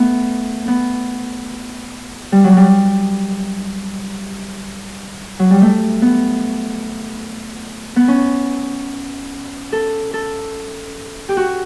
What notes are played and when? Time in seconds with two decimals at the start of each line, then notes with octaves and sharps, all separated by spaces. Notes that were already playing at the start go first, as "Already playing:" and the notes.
Already playing: A3 B3
0.68 B3
2.32 G3
2.44 F#3
2.57 G3
5.39 F#3
5.51 G3
5.62 A3
6.02 B3
7.96 B3
8.08 C#4
9.72 A4
10.14 A4
11.29 G4
11.37 F#4